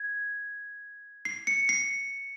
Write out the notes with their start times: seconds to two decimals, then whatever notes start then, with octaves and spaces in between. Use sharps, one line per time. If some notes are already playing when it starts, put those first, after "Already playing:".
Already playing: G#6
1.25 C7
1.47 C#7
1.69 C7